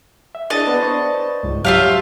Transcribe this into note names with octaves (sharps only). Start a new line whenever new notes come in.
E5
D4 E4 G#4 D#5 A5
B3 D4 B4 C5
C5 D5 C#6
C#2 G#2
F2 F#3 F4 G4 E5 F5 A5 G6